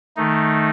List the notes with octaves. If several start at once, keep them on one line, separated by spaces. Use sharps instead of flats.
D#3 A3 D#4